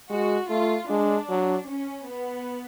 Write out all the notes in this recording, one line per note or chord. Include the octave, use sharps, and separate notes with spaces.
G#3 F#4
A3 F4
G#3 D4
F#3
C#4
B3